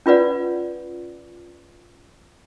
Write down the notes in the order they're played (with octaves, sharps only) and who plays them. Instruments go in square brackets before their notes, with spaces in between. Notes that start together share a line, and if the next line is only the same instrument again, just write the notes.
[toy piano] C#4 F4 B4 D5 F#5